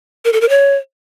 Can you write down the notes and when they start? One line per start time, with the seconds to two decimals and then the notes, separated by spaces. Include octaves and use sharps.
0.25 A#4
0.33 A4
0.41 A#4
0.49 C#5